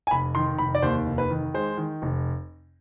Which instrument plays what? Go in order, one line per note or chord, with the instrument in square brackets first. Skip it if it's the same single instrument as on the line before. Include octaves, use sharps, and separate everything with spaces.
[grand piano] G#5
F1 B5
D#3 C6
F1 B5
D5
D#2 C5
F1
B4
D#3
G#3 C5
D#3
F1